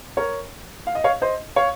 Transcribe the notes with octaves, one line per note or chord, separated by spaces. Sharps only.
A#4 C#5
F5
D#5
C#5 F5
C5 D#5
C#5 F5